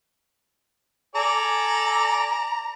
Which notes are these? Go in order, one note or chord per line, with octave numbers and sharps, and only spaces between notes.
A4 D5 G#5 A#5